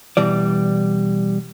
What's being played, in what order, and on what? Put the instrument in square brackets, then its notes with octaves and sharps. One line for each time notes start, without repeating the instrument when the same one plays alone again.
[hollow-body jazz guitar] B2 E3 G3 D5